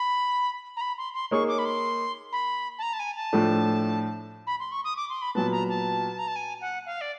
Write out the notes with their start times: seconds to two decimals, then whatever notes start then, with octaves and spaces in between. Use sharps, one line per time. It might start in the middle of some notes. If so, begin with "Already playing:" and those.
Already playing: B5
0.77 A#5
0.81 B5
0.98 C6
1.14 C6
1.31 A#3 D#4 G#4 C#5 C#6
1.48 D6
1.58 B5
1.65 C6
2.32 B5
2.79 A5
2.82 A#5
2.93 A5
2.99 G#5
3.16 A5
3.33 A2 F3 A3 D4
4.47 B5
4.60 C6
4.72 C#6
4.84 D#6
4.97 D6
5.10 C6
5.22 B5
5.35 A#2 F#3 B3 A5
5.52 A#5
5.69 A5
6.18 A#5
6.27 A5
6.36 G#5
6.61 F#5
6.86 F5
7.01 D5